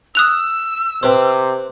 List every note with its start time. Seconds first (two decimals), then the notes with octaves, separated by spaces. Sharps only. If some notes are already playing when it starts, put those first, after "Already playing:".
0.15 D#6 E6 F#6 F7
1.03 C3 C4 B4 C5